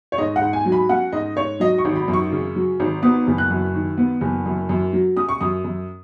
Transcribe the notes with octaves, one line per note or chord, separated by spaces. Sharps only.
C#5
G#2 D#5
F#5
G#2
G#5
F#3
B5
C#4 F#5
G#2 D#5
G#2 C#5
F#3 D#5
C#6
G#1
B5
F#2
C#6
C#3
F#3
G#1
B3 D#6
F#1
F#6
F#2
D#3
B3
F#1
F#2
F#2
F#3
C#4 D#6
C#6
F#2 D#6
F#2